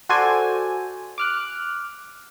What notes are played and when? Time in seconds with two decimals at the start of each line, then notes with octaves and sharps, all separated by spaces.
0.09 F#4 A4 C5 D5 G#5
1.18 D6 F6 F#6